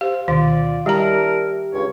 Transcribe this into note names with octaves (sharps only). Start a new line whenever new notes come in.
G4 C5 F5
D2 B2 D#3 F4 D5
G3 D4 E4 G4 A#4 A#5
C#2 G2 C#5